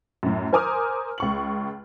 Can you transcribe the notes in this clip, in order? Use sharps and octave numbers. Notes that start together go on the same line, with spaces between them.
F#2 A2
A#4 C5 G#5 D6 D#6 F6
C#2 C#6 F#7